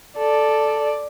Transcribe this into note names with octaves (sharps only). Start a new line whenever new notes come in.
A4 D5